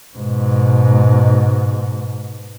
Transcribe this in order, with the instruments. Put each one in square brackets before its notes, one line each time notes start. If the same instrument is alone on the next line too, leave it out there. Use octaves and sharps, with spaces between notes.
[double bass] G#2 B2